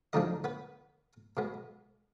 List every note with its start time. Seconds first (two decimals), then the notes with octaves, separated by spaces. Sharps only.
0.13 D2 D3 F3 G#3 D4 D#4 D#5
0.44 B3 B4
1.37 B2 G#3 B3